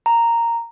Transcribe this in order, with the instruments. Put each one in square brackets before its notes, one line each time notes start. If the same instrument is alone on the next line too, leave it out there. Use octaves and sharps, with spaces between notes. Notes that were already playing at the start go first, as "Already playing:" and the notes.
[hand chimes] A#5